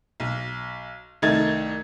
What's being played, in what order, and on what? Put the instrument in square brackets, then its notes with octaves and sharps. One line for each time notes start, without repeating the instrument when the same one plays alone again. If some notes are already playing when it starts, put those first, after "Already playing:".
[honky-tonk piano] B1
C2 D#3 A3 D#4 G#6 A6